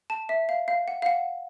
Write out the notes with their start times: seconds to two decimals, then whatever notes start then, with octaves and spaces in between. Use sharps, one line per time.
0.10 A5
0.29 E5
0.49 F5
0.68 F5
0.88 F#5
1.02 F5
1.06 F#5